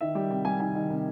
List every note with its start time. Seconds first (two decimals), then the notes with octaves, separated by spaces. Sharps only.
0.01 D#3 E5
0.15 G3 G5
0.30 C3 G5
0.45 G3 G#5
0.60 D#3 G#5
0.75 D#3
0.90 C3